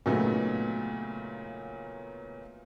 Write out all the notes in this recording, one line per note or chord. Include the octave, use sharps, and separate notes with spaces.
A#2 C#3 F#3 A3 B3 D#4